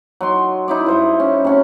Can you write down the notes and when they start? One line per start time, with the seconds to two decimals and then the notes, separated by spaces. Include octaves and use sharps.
0.21 F#3 D#4 C6
0.68 D#4 E4 D5
0.86 G2 C5 A#5
1.20 C#4
1.45 C3 C#4 F#4